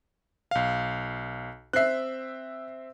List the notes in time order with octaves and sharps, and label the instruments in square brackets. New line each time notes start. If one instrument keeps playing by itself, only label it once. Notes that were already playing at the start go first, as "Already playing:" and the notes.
[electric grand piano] B1 F5
[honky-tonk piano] C4 E5 [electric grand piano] F#6 C7